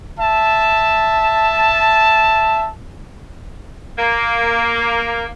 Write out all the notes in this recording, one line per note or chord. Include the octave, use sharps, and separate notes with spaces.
E5 A5
A#3